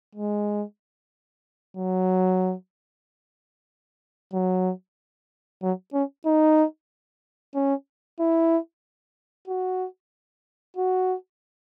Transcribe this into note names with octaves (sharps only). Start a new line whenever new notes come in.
G#3
F#3
F#3
F#3
C#4
D#4
C#4
E4
F#4
F#4